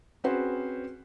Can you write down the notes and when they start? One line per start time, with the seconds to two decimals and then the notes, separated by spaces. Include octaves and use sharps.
0.24 C4 C#4 F#4 G#4 B4 C5